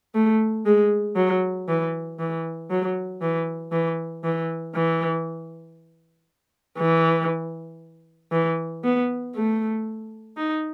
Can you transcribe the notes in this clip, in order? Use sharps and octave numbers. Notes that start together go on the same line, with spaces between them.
A3
G#3
F#3
E3
E3
F#3
E3
E3
E3
E3
E3
E3
B3
A3
D#4